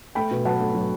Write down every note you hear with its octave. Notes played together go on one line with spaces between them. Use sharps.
A3 G5 B5
B2
F#3 F#5 A5
A3
F#3